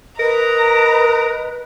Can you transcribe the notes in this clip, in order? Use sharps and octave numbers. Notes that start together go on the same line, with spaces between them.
A#4 B4 D#5 A#5